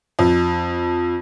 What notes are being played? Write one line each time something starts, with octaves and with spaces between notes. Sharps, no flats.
F2